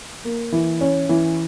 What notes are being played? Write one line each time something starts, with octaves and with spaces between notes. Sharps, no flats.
A#3
E3
C#4
E3